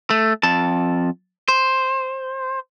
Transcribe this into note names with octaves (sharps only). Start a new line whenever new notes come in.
A3
F2 A5
C5